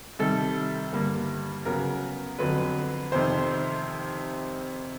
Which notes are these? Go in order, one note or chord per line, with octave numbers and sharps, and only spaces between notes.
C3 D#3 G3 A4
G2 D3 G3 A#3
C#3 F#3 B3 A#4
F2 D3 F#3 B4
F2 C3 D#3 C5